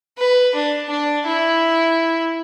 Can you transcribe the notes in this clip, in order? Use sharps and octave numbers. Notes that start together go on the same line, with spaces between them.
B4
D4
D4
E4